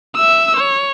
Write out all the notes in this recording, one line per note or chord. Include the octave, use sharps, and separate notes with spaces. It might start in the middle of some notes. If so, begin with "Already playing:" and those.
E5 E6
C#5